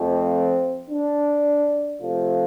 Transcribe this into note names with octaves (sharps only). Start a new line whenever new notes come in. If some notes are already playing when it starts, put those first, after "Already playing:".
Already playing: F2 F3 A3 C4
D4
C3 F3 A3 F4